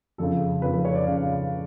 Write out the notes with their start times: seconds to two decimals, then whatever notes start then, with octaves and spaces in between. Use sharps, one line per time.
0.18 F2 C#3 A4
0.62 F2 C#3 B4
0.73 B4
0.85 C#5
0.95 D5
1.07 C#3 F5